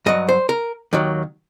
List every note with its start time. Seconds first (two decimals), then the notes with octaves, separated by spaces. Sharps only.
0.06 G2 F#3 D#5
0.29 C5
0.49 A#4
0.93 D#2 D#3 F#3